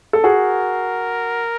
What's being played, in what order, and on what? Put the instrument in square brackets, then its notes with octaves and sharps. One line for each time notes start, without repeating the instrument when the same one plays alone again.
[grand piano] A4
[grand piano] F#4 G#4 [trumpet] A#4